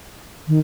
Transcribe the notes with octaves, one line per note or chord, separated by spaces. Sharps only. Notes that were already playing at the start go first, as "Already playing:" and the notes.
D#3